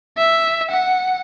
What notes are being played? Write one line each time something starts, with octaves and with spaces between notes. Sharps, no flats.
E5
F#5